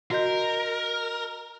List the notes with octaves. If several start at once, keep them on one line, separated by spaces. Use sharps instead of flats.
F#4 A#4 D#5 G6